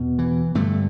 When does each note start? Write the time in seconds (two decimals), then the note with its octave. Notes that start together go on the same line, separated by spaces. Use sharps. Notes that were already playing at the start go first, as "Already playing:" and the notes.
Already playing: E2 B2
0.19 E3
0.55 G2 D3 A3